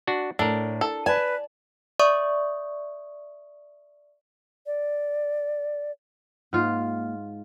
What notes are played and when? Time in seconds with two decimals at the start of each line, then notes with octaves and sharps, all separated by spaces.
0.07 D4 F#4
0.39 A2 D4 A4 A#4
0.81 A4
1.06 B4 D5 G#5 A5
1.99 D5 E5 C#6 D#6
4.66 D5
6.53 G#2 A#3 F4